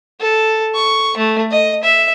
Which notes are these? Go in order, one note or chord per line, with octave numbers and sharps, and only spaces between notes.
A4
C#6
A3
D#5
E5